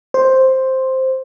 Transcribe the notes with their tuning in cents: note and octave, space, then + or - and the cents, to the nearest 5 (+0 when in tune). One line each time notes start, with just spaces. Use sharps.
C5 +5